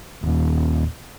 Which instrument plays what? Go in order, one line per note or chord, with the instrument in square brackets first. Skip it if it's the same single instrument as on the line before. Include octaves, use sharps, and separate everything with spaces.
[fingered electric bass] D#1